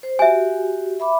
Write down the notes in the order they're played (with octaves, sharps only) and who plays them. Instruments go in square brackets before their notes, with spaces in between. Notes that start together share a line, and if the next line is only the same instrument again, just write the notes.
[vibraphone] C5
[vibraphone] F#4 G4 [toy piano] E5 G#5
[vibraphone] E5 B5 D6